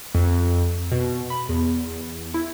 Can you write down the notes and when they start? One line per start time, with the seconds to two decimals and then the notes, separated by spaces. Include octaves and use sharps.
0.15 F2
0.92 B2
1.30 B5
1.49 E2
2.34 E4